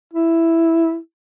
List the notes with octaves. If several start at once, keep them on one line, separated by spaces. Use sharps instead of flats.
E4